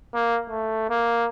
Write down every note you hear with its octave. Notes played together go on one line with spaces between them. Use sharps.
A#3
A3
A#3